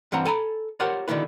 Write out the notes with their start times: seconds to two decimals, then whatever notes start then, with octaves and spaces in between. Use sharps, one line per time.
0.12 G2 E3 C4 F#5 A#5
0.25 A4 G#5 A#5 B5
0.80 F4 G4 A#4 C5 C#5 F#5
1.08 B2 D3 D#3 E4 B4